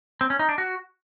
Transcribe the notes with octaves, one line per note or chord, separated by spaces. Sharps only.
C4
C#4
D#4
D4
F#4